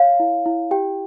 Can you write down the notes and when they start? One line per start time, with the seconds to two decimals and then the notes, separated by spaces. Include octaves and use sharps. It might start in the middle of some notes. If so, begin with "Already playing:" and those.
Already playing: C#5 F5
0.20 E4
0.46 E4
0.71 G4 G5